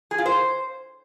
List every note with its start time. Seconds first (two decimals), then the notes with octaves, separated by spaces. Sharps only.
0.11 G#4
0.18 F4
0.26 C5